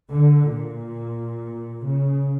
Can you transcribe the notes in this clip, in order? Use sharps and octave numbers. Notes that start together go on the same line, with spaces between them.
D3
A#2
C#3